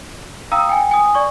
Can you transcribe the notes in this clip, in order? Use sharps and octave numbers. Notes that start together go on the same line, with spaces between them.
F5 G5 A#5 D#6 E6
G5 G#5
G#5 D#6
D5 C#6